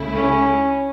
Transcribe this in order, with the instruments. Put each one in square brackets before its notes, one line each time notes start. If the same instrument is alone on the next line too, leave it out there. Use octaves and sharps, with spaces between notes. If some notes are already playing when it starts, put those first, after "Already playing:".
Already playing: [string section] C#2 C#3 A3 E4
[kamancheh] C#4